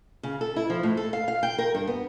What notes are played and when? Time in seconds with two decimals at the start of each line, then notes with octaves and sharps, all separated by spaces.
0.23 C#3
0.41 A4
0.56 E4
0.70 F3
0.83 A2
0.97 A4
1.13 F5
1.28 F5
1.43 G5
1.58 A#4
1.75 G2
1.87 B3